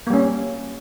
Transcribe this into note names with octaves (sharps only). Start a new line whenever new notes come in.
G3 A#3 C#4